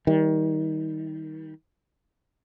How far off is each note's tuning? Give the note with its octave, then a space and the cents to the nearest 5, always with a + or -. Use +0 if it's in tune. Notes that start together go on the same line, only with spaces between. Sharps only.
D#3 +25 G3 +0